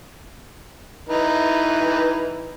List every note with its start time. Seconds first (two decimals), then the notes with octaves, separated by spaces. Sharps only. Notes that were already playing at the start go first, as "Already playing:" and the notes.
1.09 E3 D#4 B4